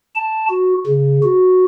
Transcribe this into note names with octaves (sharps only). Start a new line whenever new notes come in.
A5
F#4
C#3
F#4